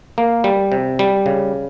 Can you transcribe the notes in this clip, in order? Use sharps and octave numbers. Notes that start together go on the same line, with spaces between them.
A#3
G3
C3
G3
C#3